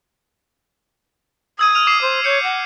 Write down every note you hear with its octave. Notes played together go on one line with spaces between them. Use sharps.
D#6 E6 G#6 D#7
F6 D#7 F7
D6 G#6 C7
C5
C#5 G6 C#7
F#5